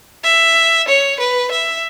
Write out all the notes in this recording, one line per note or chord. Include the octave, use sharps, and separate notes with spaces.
E5
C#5
B4
E5